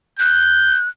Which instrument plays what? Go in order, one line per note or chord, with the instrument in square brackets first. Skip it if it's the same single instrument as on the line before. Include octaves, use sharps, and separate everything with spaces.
[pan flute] F#6 [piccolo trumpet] G6